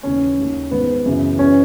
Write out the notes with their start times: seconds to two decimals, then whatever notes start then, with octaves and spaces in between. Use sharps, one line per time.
0.03 D#2 C#3 E3 C#4
0.38 D#2 D#3
0.71 G#2 D#3 B3
1.06 F#2 C#3 E3
1.39 F#2 E3 C#4